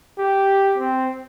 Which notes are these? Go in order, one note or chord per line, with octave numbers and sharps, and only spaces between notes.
G4
C4